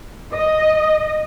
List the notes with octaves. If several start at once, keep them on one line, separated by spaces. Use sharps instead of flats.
D#5